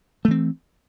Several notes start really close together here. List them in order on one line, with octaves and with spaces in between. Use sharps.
A3 E3 C4